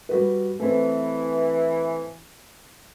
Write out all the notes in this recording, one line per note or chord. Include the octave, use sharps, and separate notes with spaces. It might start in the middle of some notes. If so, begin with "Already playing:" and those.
G3 F#4 B4
E3 A3 C4